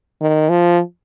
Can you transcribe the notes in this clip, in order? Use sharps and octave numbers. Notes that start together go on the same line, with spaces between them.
D#3
F3